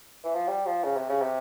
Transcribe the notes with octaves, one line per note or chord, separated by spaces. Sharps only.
E3
F3
G3
F3
C#3
C3
C#3
C3